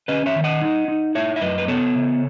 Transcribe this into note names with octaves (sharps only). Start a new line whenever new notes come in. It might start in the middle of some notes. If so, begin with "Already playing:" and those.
C#4 B4 D#5
C#5 E5
D#3
D#5 F#5
D#4
D#4
E4 C#5 E5
E5
F#2 B4 D#5
B4
B3 A4 C#5
C#3